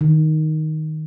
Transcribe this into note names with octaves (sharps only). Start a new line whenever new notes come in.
D#3